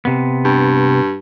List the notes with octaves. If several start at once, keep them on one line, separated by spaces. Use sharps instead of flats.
C3 B3
G2